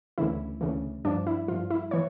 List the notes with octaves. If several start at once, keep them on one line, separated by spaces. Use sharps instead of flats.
D2 C#3 E3 E4
D2 C#3 E3
G2 F3 D4
E4
G2 F3 F4
E4
E3 C#5